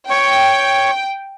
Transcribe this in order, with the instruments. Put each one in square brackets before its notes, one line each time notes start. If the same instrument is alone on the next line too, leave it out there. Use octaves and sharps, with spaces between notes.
[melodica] C#5 C#6 [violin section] G5